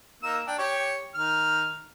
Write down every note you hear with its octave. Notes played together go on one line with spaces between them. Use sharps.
A#3 D#4 E6
D4 G5
G4 C#5 C#6
D#3 F6